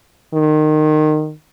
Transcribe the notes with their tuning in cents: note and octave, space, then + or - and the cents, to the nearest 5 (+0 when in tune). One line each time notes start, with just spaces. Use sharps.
D#3 -20